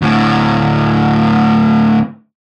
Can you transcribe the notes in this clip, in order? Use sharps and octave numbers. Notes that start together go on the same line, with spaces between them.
D2 A2